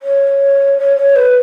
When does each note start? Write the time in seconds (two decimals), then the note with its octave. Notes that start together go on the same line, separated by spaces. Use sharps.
0.02 C#5
0.78 C#5
0.97 C#5
1.16 B4